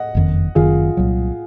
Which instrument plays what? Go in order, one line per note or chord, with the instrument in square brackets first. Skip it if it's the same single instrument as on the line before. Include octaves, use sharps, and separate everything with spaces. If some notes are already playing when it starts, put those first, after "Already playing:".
Already playing: [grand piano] D#5 F#5
[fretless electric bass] F#1 F2 D#3
[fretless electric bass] F#1 F#2 D#3 [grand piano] F4 G#4
[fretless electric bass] C2 A#2 F#3